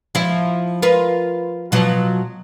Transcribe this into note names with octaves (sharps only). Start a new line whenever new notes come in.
F3 E4
F4 A#4 B4
B2 F3 F#3